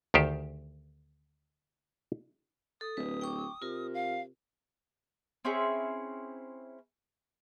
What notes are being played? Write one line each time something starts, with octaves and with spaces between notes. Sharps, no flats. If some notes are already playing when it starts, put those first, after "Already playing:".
D2 D#3 G4 C5
A4 D#6
D1 B4
G5 C#6 D6
C3 F4 A#4
F5
C4 C#4 E4 G#4